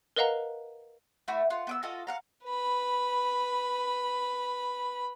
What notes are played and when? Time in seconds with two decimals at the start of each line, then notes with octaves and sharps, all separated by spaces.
0.16 A#4 B4 D#5 F5 F#5 A#5
1.28 A3 E4 F#4
1.50 F4 F#5
1.67 B3 D6 E6
1.83 F4 F#4 A4 D#5
2.07 F5 F#5 A#5
2.45 B4 B5